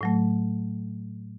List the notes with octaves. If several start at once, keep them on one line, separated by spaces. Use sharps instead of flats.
A2 F#3 A3